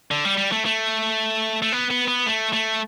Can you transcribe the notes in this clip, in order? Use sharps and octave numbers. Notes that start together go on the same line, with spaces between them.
D3
G3
G3
A3
A3
A3
B3
B3
B3
A3
A3